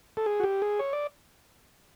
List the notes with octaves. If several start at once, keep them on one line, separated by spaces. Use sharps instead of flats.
A4
G#4
F#4
G4
G#4
C#5
D5